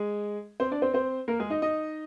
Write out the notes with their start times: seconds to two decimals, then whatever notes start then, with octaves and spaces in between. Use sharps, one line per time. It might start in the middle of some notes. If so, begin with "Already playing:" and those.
Already playing: G#3 G#4
0.60 C4 C5
0.71 D4 D5
0.82 C4 C5
0.94 C4 C5
1.28 A#3 A#4
1.40 G#3 G#4
1.50 D#4 D#5
1.62 D#4 D#5